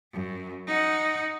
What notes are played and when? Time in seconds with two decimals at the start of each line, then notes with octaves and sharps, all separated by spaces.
0.13 F#2
0.67 D#4 F#5